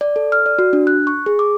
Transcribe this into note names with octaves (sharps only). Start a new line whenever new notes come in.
D5
A4
F6
D5
F#4
D4
F#6
C#6
G#4
D6